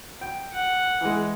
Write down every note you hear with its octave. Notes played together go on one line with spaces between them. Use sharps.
G5
F#5
E3 G#3